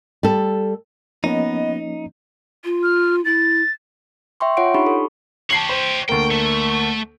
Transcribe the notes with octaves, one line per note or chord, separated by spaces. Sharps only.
G3 A4
F3 A#3 B3 C#4 D#4 D#5
F4
F6
E4 A6
E5 G5 C6 C#6
F4 C#5 F#5 C6 D7
D4 D#4 G4 B5 C#6
A4
G4 C#5 A5 C7 F#7
C5
D2 A#3 G5
A3